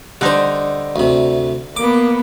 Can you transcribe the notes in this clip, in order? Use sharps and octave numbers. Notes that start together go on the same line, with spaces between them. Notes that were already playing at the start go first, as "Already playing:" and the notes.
D3 G3 D#4 C5
D2 C3
A#3 B3 D6